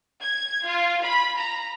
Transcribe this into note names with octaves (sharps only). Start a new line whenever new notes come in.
G#6
F4
B5
A#5